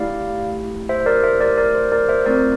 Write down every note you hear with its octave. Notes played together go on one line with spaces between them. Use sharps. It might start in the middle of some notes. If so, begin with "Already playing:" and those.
Already playing: A3 E4 G4 D5 F5
C5 E5
A#4 D5
C5 E5
A#4 D5
A#4 D5
C5
A#4 D5
C5 E5
A3 C4 F4 A#4 D5